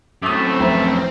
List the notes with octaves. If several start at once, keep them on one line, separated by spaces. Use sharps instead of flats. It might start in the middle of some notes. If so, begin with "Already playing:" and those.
F#2 A2 A3 C4 D6 D#6
F1 E3 A#5